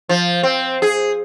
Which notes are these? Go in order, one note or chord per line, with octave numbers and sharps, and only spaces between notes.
F3
C4
G#4